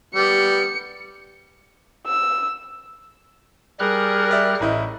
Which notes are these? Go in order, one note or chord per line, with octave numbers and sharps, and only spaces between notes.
G3 B3 C#7
E6
G3 G#4 A#4 F6 F#6
D5 E5
A1 E4 D#5